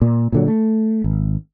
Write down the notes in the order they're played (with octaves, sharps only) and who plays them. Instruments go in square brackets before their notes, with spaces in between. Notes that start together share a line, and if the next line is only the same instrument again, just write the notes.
[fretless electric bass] A#2
A#2 D3 F#3
A3
G#1